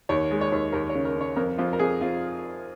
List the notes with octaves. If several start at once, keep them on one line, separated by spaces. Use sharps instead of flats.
D#2 C#5
G#3
C#5
D#2
D#2 A#4
C#5
C#3
A#4
C#3 C#5
F2 A#4
F2 F4
A#4
F2 G#4
F2 F4